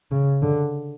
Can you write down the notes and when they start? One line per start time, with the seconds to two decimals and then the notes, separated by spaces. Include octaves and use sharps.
0.11 C#3
0.42 D3